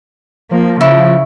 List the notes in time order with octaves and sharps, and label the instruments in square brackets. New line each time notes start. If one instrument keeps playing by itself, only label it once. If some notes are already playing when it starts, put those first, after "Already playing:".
[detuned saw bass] F3 [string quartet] A#3
[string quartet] C#3 [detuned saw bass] F3 [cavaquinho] E4 C#6